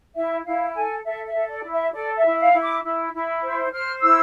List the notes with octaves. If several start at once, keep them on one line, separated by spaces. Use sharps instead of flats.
E4 E5
E4 F5
A4 G#5
A4 E5
E5
A4
D5
E4
E5
A4 D5
E5
E4
F5
E4
D6
E4
E4
C5
C5 F6
E4 E6